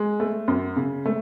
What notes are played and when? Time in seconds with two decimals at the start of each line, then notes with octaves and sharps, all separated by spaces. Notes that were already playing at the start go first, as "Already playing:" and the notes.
Already playing: G#3
0.20 A3
0.48 F#2
0.76 C#3
1.06 A3